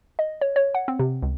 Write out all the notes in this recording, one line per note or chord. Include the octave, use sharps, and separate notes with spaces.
D#5
C#5
C#5
F#5
C4
C3
C#2